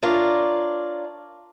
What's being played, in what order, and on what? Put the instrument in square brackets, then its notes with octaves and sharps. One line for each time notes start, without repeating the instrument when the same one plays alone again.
[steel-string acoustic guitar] D4 F4 A#4 C#5 D5